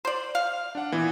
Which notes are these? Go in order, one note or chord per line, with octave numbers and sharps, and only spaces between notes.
C5 D5
F5
D4 F#5
A#2 E3 B3